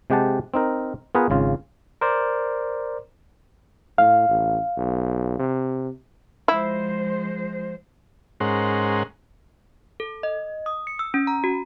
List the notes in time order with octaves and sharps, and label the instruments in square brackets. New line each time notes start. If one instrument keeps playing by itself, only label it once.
[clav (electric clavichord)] C3 G#3 G4 F#5 A5
C4 D#4 A#4
B3 F4 G#4 A#4 B4
G#1 C#3 F4
[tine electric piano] A#4 C5 D5
[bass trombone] A2 [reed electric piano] F5
[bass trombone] A1
B1
C3
[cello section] F3 G#3 C5 [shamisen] E4
[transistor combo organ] G#2 G#3 C#4 A#4 C5 F#5
[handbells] A4
D#5
D#6
C#7
E6
C#4
A#5
F#4